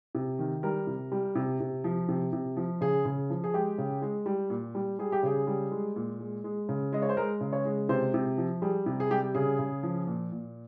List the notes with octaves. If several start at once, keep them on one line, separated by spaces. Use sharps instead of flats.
C3
D#3
G3 A#4
C3
G3
C3
C3
F3
C3
C3
F3
C#3 G#4
C#3
F3
G#4
G#3 G4
C#3
G#3
G3
A#2
G3
G3 G#4
G4
C#3 G#4
G3
G#3
A#2
G#3
G#3
C#3
G#3 D#5
C#5
C5
G#3 A#4
C#3
C#5
G#3
C3 C5
C3
F3
G3 G#4
C3
G#4
G3 G4
C#3 G#4
C#3
F3
A#2
A#2